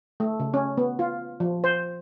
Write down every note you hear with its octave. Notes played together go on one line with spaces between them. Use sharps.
A3
C#3
C#4
B3
F4
F3
C5